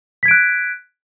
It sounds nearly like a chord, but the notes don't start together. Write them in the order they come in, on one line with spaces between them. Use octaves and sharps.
B6 G#6 D7 F#6